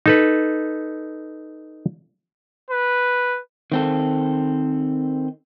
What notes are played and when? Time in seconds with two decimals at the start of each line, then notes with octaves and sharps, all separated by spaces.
0.06 D#4 A4 B4
2.71 B4
3.72 D#3 C4 A4